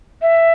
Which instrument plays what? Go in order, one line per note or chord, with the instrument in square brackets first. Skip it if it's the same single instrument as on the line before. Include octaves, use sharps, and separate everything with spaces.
[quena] E5